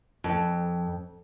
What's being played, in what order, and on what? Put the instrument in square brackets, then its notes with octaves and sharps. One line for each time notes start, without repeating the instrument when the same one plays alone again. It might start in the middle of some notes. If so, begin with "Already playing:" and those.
[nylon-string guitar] F2